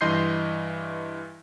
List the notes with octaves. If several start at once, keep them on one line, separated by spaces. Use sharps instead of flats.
G2 E3 D#5 C6 G6 C7